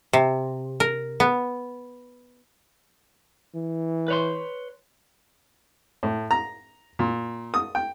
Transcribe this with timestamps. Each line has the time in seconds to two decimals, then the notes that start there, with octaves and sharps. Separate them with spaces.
0.13 C3
0.80 A#4
1.20 B3
3.55 E3
4.08 B4 C#5 C6
6.03 A2
6.31 A#5
6.99 A#2
7.54 D#6
7.75 G5